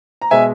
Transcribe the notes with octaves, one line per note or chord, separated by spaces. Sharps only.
A#5
B2 G#3 E5 G#5